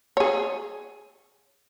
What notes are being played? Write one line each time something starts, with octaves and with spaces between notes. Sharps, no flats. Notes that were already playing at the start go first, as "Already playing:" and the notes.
G#4 C#5